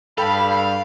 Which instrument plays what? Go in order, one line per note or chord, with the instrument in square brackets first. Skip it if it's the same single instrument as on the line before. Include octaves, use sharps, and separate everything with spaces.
[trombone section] G2 [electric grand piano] A4 G5 [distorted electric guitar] F5 [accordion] B5